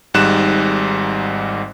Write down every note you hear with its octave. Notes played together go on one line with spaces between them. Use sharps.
G#1 G#2 G3 F#6 E7